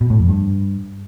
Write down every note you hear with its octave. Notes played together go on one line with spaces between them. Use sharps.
B2
A2
F2
G2